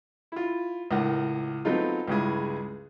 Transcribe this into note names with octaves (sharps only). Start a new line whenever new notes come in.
E4 F4
C#2 A2 A#4 F#5
F#3 A3 B3 C4 D#4 F4
C#2 G2 C#3 G#3 E4 G#4